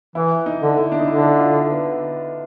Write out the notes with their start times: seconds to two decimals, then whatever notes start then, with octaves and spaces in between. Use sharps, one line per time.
0.15 E3 E4
0.46 D#4
0.61 D3
0.77 E4
0.92 D4
1.00 D#4
1.08 D3 E4
1.39 F4
1.70 B3